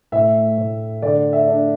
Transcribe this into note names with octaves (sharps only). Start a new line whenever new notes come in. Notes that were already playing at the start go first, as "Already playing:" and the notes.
A2 E5
A2
D3 D5
E5
D4